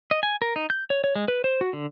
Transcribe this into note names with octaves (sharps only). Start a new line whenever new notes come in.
D#5
G#5
A#4
D#4
G6
C#5
C#5
G#3
B4
C5
F#4
D3